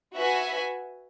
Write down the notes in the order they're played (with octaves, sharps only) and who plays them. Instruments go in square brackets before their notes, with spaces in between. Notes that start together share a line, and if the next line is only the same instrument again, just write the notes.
[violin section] F#4 B4 E5 G#5